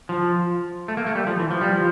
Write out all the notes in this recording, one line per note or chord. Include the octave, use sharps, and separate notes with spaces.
F3
A3
A#3
A3
G3
F3
E3
F3
G3
F3